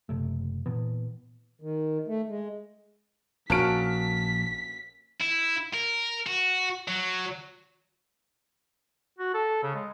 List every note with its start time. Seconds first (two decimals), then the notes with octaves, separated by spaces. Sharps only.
0.09 F#1 C3 A3
0.66 A#2 E3 B3
1.62 D#3
2.08 A3
2.29 G#3
3.50 A#1 A#3 C#4 F#4 A5 F6 B6 D7
5.21 E4
5.74 A#4
6.27 F#4
6.88 F#3
9.19 F#4
9.34 A4
9.63 C#3
9.75 G#3